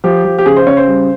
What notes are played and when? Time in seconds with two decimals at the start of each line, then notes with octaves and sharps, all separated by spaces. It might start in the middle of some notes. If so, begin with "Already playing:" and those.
0.04 F3 G4
0.25 F3
0.39 G4
0.46 C#3 G#4
0.56 C5
0.67 C#3 C#5
0.77 C5
0.87 G3